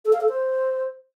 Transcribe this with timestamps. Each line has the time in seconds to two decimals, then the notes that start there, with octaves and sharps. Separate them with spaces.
0.05 A4
0.13 F5
0.21 A4
0.29 C5